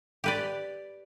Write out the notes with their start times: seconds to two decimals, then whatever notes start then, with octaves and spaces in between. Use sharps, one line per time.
0.24 G4 B4 D5